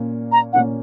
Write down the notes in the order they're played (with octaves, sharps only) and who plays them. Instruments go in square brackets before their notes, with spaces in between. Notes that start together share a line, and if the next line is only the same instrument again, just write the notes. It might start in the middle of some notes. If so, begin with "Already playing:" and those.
Already playing: [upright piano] A#2 A#3 C#4
[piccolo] A#5
[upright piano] A#2 A#3 C#4 [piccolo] F#5